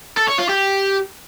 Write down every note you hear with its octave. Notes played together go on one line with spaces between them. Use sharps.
A4
C#5
F4
G4